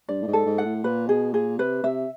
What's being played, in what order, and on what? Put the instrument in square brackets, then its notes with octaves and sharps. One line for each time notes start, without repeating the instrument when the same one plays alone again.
[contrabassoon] G2 [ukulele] D5
[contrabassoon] A2
G#2
[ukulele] A4
[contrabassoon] G#2
[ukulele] F#5
[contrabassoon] A2
[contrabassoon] A#2 [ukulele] B4
[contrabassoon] B2 [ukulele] G#4
[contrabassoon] A#2 [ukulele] G#4
[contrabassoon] C3 [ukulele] B4
[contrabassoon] C3 [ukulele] E5